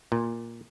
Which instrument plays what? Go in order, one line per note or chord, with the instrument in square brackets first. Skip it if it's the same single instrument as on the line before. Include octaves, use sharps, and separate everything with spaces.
[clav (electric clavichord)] A#2